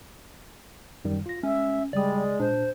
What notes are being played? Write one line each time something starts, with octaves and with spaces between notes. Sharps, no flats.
F#2 D#3 G3
F4 A#6
G#3 C#4 E5
C#3 G3 G#3 D5 D#6
A#2 D4 C5